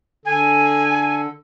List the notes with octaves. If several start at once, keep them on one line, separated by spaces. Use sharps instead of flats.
D3 A4 G#5